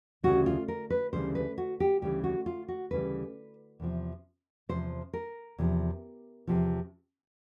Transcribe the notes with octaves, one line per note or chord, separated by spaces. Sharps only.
D2 C#3 E3 G3 F#4
F4
A#4
B4
D2 C#3 E3 G3 C5
B4
F#4
G4
D2 C#3 E3 G3 G4
F#4
F4
F#4
D2 C#3 E3 G3 B4
E2 C3 F3
E2 C3 F3 C5
A#4
E2 C3 F3
E2 C3 F3